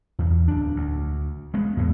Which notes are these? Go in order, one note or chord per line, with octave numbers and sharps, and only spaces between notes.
E2
D1 D4
D2
G#3 B3
E2 A2